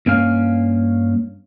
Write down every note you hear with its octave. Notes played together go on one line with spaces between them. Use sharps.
G2 A#3 C#4 F5